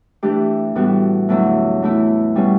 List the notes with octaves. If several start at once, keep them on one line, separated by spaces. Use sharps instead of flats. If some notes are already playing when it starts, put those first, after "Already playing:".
E3 A3 D4 G4
A2 E3 G3 B3 F#4
E2 D3 F#3 A3 E4
E3 A3 E4
B2 G3 C#4